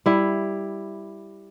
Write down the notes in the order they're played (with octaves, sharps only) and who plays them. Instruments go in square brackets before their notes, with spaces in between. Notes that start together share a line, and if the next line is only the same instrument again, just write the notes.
[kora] G3 E4